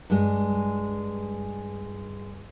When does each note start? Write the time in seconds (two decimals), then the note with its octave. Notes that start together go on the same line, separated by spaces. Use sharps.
0.10 G2 G#3